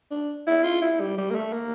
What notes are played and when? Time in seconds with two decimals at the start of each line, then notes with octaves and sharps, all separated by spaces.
0.11 D4
0.47 E4
0.64 F4
0.81 E4
1.00 G3
1.18 G3
1.31 A#3
1.35 A3
1.53 A#3